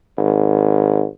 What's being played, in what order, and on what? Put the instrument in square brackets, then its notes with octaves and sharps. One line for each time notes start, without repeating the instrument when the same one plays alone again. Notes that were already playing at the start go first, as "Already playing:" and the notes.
[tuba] G#1